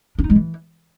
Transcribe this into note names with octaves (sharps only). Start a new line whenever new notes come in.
D4
D#4
G#3
E3